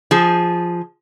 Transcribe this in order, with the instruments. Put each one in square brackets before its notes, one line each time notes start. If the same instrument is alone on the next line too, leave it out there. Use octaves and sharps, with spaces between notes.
[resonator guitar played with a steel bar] F3 G#4